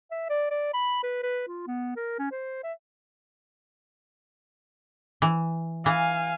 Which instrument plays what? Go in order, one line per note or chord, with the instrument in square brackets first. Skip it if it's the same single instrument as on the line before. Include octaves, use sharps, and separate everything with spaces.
[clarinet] E5
D5
D5
B5
B4
B4
F4
B3
A#4
C#4
C5
E5
[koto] E3
[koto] E3 [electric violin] F5 G#5